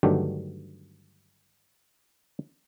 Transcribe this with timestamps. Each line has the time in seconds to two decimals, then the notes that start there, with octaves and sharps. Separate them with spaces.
0.03 G2 D3 D#3 F#3 A3 G4